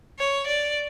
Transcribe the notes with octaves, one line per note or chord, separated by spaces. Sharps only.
C#5
D5